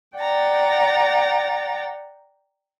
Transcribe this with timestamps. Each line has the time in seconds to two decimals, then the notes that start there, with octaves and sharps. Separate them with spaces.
0.17 D5 F#5 G5 A#5 A6